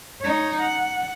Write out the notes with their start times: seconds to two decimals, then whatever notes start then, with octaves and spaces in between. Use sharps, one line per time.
0.21 D#4 C#5
0.60 F#5